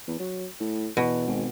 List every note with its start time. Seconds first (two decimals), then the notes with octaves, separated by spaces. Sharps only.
0.07 E2
0.19 F#3
0.60 A2
0.97 E2 B2
1.27 G#1